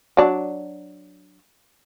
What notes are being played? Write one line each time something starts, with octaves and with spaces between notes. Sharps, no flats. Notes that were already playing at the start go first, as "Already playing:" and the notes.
F#3 D4